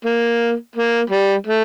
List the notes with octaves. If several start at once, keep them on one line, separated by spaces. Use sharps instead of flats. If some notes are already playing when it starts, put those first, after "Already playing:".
A#3
A#3
G3
A3